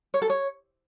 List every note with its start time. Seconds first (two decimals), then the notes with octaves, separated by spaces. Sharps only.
0.14 C#5
0.22 A4
0.30 C#5